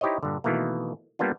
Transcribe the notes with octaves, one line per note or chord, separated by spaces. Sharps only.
D#4 E4 G4 C5 C#5 D#5
G2 A#2 D3
B2 D#3 E3 A3 A#3
G3 A#3 B3 D4 F4